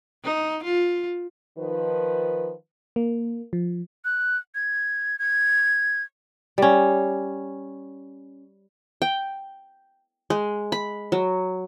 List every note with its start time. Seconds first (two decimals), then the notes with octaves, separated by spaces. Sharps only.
0.24 D#4
0.64 F4
1.58 D#3 F3 B4
2.96 A#3
3.53 F3
4.05 F#6
4.55 G#6
5.19 G#6
6.58 G3 C#4
9.02 G5
10.30 G#3
10.72 B5
11.12 F#3